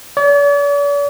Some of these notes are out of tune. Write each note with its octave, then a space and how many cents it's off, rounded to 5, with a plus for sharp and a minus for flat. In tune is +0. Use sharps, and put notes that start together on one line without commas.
D5 -45